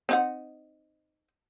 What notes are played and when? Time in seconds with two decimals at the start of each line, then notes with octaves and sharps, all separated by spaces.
0.09 C4 D#4 F#5